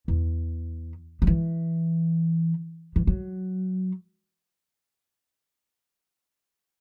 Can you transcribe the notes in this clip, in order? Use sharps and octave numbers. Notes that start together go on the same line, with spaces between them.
E2
F#3
E3
E3
F#3